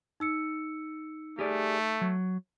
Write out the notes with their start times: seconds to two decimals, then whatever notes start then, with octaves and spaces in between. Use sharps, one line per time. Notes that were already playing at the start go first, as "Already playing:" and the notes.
0.20 D#4 E6 C#7
1.39 A3 G4 G#4 D5
2.01 F#3